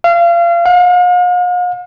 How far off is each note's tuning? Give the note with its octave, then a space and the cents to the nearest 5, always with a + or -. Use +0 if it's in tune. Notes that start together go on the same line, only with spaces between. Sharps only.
F5 -30
F5 +45